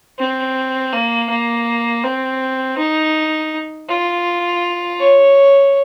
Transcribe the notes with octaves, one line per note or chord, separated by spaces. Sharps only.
C4
A#3
A#3
C4
D#4
F4
C#5